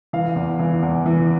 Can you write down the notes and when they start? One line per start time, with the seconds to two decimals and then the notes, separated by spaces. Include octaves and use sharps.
0.13 E3 F5
0.36 E2
0.59 E3
0.82 E2
1.06 E3